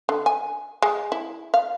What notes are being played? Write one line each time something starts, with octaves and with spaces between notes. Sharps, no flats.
D3
G#5
G#3
E4
F5